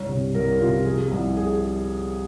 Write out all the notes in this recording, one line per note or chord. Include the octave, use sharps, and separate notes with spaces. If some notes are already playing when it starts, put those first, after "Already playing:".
Already playing: C2 G2 C#5
C3
C2 A#4
C3 F4
F3 G#4
C2
G#4